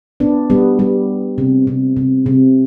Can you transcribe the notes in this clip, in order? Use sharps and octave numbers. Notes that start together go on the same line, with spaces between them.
B3 D4
G3 B3
G3
C3
C3
C3
C3